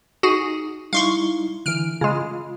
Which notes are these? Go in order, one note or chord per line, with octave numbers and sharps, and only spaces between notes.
D#4 F#4 G#4
G3 D#4 E4 F5 C6 C#6
D3 E3 F6 D7
C#3 G#3 F4